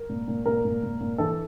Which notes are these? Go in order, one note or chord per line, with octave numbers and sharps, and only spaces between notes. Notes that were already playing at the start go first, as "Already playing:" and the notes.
Already playing: A#4
A#2
A#2
A#2 A#4
A#2
A#2
A#2
E3 A4